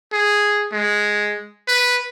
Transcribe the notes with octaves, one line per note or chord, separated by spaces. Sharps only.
G#4
G#3
B4